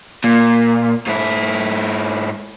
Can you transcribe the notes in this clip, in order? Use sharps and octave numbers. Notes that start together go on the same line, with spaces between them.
A#2
G#2 E4